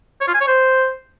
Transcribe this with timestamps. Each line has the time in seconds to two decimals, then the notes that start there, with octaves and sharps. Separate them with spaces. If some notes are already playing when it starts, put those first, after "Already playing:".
0.21 C#5
0.28 F4
0.34 G#5
0.41 C#5
0.47 C5